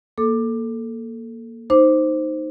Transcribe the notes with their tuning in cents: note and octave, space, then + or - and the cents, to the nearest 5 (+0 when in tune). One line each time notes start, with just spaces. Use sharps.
A#3 +0 A4 +0 D6 +15
D#4 +0 C5 +0 D6 +0